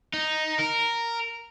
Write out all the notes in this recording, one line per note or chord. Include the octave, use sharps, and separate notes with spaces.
D#4
A#4